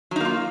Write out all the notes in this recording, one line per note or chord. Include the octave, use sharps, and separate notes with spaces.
F#3 A#3 D#4 F4